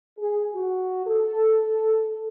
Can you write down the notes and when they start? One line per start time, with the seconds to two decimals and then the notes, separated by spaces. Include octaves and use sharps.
0.18 G#4
0.54 F#4
1.07 A4